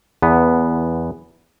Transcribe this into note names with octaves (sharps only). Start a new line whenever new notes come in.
E2 B3